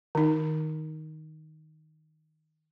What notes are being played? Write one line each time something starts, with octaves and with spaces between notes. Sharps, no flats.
D#3 D#4